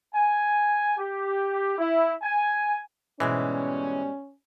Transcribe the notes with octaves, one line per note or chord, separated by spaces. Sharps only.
G#5
G4
E4
G#5
G#2 B2 E3 G3 G#3 C#4